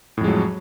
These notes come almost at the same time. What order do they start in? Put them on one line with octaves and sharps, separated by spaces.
A2 F2 G#3 F#3